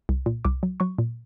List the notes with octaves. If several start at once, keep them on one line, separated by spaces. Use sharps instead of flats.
C2
A#2
C2 D6
F#3
F#3 C#6
A#2